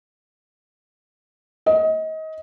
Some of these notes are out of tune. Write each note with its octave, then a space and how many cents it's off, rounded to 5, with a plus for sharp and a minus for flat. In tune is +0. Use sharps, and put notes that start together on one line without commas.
D#5 +25